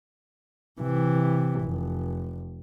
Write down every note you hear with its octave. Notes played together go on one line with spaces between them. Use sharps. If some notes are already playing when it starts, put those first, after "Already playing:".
C3 E3
F1